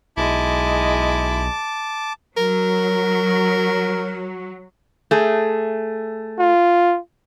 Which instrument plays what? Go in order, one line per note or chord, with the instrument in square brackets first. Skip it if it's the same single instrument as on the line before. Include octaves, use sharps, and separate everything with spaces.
[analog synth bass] B1 [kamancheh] G#3 D#5 [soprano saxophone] E4 [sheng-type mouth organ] A5 D6
[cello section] F#3 [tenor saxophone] A#4
[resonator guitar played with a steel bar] A3 G#4
[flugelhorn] F4